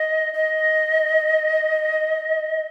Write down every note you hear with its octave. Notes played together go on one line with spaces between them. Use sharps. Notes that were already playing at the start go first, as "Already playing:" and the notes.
Already playing: D#5
D#5